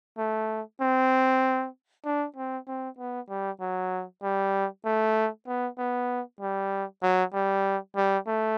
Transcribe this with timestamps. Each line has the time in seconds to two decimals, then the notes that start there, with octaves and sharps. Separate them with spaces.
0.18 A3
0.81 C4
2.05 D4
2.36 C4
2.67 C4
2.99 B3
3.29 G3
3.61 F#3
4.23 G3
4.85 A3
5.47 B3
5.78 B3
6.41 G3
7.02 F#3
7.34 G3
7.96 G3
8.27 A3